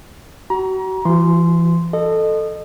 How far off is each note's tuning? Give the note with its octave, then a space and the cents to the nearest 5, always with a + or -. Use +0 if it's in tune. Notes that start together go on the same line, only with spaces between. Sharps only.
F#4 +35 A#5 +30
E3 +40 F#4 +0 C6 -10
A4 +0 D#5 -25